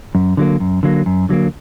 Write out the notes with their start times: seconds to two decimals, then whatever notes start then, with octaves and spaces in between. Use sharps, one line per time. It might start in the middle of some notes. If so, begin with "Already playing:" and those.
0.15 F#2
0.37 D3 F#3 A#3
0.60 F#2
0.83 D3 F#3 A#3
1.06 F#2
1.29 D3 F#3 A#3